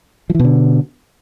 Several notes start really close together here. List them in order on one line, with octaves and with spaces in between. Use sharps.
F3 E3 B2 D3